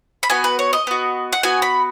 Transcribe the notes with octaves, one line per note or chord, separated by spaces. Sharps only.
B5
B3 F#4 G#5
B4
C#5
D#5
B3 F#4
F#5
B3 F#4 G#5
B5